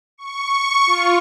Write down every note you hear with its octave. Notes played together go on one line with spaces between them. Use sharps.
C#6
F4